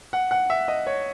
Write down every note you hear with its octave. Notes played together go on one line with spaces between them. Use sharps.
F#5
F#5
E5
D#5
C#5